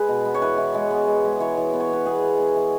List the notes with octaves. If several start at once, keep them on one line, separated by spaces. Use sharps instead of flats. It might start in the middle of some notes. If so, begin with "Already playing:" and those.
Already playing: G#3 G#4 B4
B2
B3
C#5
E3 B4
E3
G#3
B3
G#3
G#3
E3 C#5
E3
B3
C#5
B3 B4
B3 G#4
B3
B3
E3